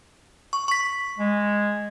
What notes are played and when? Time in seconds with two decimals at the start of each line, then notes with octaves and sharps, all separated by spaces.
0.53 C#6
0.68 C#6 B6
1.18 G#3